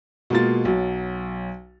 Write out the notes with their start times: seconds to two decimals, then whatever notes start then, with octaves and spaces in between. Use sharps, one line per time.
0.30 B2 G#3 A#3 F4 A6
0.65 B1 F#3